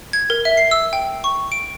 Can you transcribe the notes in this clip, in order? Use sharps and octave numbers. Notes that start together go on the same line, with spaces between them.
G#6
A#4
E5
C7
E6
G5
C#6
D7